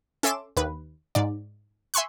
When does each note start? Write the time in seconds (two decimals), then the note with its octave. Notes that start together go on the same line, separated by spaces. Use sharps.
0.23 C#4 A4 E5 C6 D6 E7
0.57 D#2 B4
1.15 G#2 D5
1.94 E5 G#5 C6 C#6 F#6